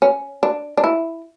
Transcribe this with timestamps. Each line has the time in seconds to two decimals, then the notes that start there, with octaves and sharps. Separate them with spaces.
0.02 C#4
0.43 D4
0.77 D4
0.84 E4